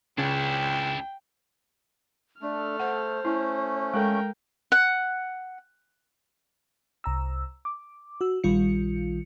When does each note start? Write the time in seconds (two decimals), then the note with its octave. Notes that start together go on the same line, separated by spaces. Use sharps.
0.18 C#2 C#3 D4 E4 G5
2.42 A3 D4 A4 F6
2.80 C5 F#5
3.25 A3 C#4 E4
3.94 G#3 A4 A#4 G5
4.72 F#5
7.04 C2 A#5 E6
7.65 D6
8.21 F#4 E6
8.44 A#1 D#3 G3 F4 C#7